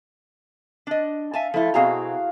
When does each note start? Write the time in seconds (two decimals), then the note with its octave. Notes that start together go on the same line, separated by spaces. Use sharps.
0.87 D4 D#5
1.34 E5 F5 G#5 A5
1.54 F3 A3 E4 A4
1.74 B2 C4 F#4 G#4 F5 A#5